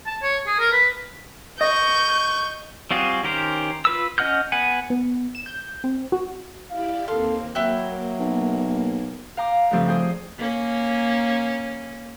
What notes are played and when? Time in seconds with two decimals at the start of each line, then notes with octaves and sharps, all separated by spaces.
0.06 A5
0.22 C#5
0.47 G#4
0.59 A#4
0.72 B4
1.61 D#5 C#6 G6
2.91 G3 C4 F4 F#4 G#4
3.23 D#3 C#4 G4 A#4 C5
3.85 F4 B4 E6
4.18 C#4 D#5 F#5 F6 G6
4.52 B3 F#5 G#5
4.90 B3
5.35 E7
5.46 G6
5.84 C4
6.12 F#4
6.71 E4 G4 D5 F5
7.08 D#2 A#3 C4 A4 F5 C6
7.55 F#3 A#3 E4 G5 F#6
8.19 B1
9.37 F5 G5 A#5 D6
9.71 G2 C#3 F3 A3 C4 G4
9.88 G#4 C5 G5
10.38 A#3 C#4